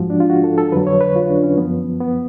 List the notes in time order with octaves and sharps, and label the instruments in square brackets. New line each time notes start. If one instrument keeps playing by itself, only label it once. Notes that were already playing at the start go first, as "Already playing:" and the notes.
Already playing: [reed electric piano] G#2 F3 F#4
D4
F4
F#4
A4
A4
F2 D3 F#3 B4
C#5
B4
F4
D4
C#4
F#2 F3 B3
B3